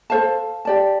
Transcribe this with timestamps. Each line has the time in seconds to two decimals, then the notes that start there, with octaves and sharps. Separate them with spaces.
0.10 A4 C5 F5 A5
0.65 G4 D5 A5